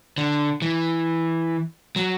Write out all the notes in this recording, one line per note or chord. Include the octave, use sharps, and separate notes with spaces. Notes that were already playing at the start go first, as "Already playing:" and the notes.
D3
E3
F#3